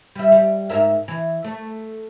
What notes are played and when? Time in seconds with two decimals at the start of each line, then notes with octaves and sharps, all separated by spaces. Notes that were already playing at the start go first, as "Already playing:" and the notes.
0.15 G3 E5
0.32 G3
0.70 G#2 A#4 E5
1.08 E3
1.44 A3